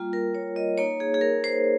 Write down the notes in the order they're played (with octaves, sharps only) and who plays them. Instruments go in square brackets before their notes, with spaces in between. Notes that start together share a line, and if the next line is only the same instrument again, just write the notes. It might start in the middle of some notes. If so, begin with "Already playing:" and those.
Already playing: [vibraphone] G3 A#3 F4
A#4
C#5
D#5
A#3 D#4 C#5
G#4
G#4
A#4
C5